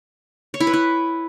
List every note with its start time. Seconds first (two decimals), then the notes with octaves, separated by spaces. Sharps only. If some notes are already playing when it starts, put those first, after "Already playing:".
0.54 C#5
0.60 E4
0.67 B4
0.74 E4